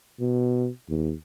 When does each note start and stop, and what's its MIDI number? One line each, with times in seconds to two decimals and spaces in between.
0.20 0.68 47
0.89 1.13 39